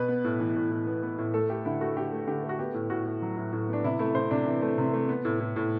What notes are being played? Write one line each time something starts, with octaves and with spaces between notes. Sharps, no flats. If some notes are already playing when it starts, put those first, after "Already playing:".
Already playing: B2 B4
B3
A2
E3
A2
A2
B3
B3
A2
A3 A4
A3 G4
D3 E4
A3 F#4
D3 G4
A3
D3 G4
A3
F#4
B3 G4
A2
A2 F#4
A2
F#3
A2
A2
B3 D4
C3 E4
A3 E4
C3 C5
C3 D4
E3
A3
C3
A3
B3
A2
A2
A2